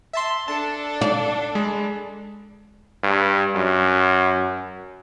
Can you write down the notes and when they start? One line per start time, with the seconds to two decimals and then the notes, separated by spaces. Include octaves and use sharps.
0.13 E5 A5 C6
0.48 D4 A4 A5
1.01 D5
1.55 G#3 B5
3.03 G2
3.55 F#2